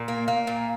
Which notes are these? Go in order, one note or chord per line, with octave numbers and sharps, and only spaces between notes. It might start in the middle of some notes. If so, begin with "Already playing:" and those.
Already playing: A#2
A#3
A#3
A#2